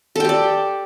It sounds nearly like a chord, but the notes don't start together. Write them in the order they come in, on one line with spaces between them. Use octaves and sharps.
A4 G5 G4 D5